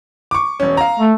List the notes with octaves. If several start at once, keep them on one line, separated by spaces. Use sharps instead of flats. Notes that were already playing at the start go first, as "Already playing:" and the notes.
C#6 D6
E1 C#4
F5 A#5
A3